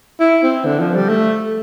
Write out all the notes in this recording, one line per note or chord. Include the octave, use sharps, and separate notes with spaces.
E4
C4
D3
F3
G3
A3